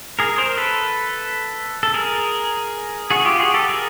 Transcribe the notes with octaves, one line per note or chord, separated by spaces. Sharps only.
G#4 A#4
A#4 C5
A4 B4
A4
G#4 A#4
F#4 G#4
F4 G4
F#4 G#4
G4 A4
G#4 A#4